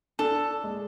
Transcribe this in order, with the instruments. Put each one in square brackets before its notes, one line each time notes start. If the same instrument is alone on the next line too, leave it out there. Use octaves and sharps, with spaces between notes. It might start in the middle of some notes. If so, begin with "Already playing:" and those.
[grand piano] D4 [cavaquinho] A4
[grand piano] G#3